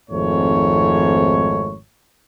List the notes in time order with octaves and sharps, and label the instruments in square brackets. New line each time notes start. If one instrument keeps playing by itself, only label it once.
[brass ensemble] G#1 F2 G#2 A3 C#5